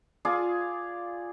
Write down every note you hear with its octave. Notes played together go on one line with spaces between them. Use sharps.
F4 G#4 D5